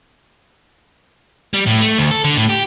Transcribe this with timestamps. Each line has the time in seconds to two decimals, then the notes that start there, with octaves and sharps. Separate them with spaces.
1.54 G3
1.67 A2
1.81 A3
1.98 D2
2.11 A4
2.24 D3
2.37 A2
2.49 G4